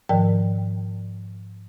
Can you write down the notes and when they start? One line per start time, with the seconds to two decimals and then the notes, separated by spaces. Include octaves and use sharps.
0.09 G#2 D#3 F3 A#4 D5 G5